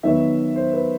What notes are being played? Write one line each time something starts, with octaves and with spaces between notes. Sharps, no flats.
D#3 F#3 B3 E5
C5
B4